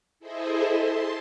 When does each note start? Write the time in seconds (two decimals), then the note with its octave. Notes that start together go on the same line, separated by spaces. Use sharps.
0.19 E4 G#4 A4 C5 D#5 E5
0.66 A5 C6